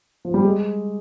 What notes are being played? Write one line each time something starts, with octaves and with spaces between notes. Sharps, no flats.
F3
G3
G#3